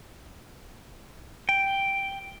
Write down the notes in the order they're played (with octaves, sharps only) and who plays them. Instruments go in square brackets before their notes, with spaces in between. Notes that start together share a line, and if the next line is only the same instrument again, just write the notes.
[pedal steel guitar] G5